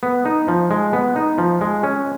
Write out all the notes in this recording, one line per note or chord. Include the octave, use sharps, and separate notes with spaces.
B3
D#4
F3
G#3
B3
D#4
F3
G#3
C#4